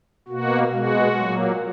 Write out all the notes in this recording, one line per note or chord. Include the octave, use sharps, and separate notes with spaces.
B2 A#3 F#4
B2 G#3 F#4
A#2 F#3 A#3